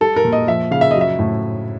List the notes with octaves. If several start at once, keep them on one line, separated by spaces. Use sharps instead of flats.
G3 A4
A#4
A#2
D#5
F3 E5
C#3 F5
E5
F#3 D#5
E5
A2